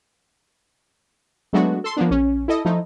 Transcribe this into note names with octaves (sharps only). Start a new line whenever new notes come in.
F#3 G#3 A3 B3 D4 F#4
A4 C6
F3 A#3 B3 D4
A#1 C#4
E4 A4 D#5
F3 A3 D#4 E4